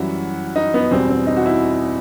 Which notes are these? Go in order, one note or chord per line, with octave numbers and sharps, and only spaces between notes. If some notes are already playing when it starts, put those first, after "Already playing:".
Already playing: F#2 E3 G3 E4 F#4
D#4
B3
E2 B2 G3 C4
C4
D#4
F#4
E4